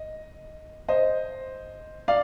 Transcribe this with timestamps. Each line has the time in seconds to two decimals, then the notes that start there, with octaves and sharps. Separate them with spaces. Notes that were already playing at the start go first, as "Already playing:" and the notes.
Already playing: D#5
0.88 C5 D#5
2.08 D5 F5